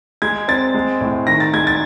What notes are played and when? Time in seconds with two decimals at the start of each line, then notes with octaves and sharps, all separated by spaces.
0.22 G#3 G#6
0.48 C4 A6
0.75 G#3
1.01 A2
1.27 D#3 A#6
1.40 A6
1.54 G#3 G#6
1.67 A6